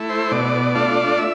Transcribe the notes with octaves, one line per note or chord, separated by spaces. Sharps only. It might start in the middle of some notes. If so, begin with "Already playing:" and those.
Already playing: A3 E4
C5
B2 D5
A3 D4 F4
E5